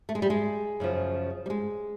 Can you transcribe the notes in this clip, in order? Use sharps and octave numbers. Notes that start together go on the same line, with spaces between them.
A3
G#3
G3
G#3
F#2 C#3 F3
G3
G#3